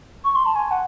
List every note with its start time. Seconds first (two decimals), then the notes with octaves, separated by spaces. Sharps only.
0.25 C#6
0.35 C6
0.46 A5
0.55 G#5
0.71 F#5